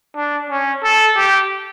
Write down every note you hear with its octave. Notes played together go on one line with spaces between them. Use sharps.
D4
C#4
A4
G4